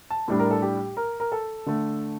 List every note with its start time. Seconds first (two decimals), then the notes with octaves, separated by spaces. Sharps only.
0.10 A5
0.28 A2 G3 D4
0.39 A#4
0.51 A4
0.62 G4
0.97 A#4
1.20 A#4
1.32 A4
1.66 D3 A3